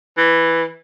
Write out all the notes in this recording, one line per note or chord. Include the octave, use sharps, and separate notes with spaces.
E3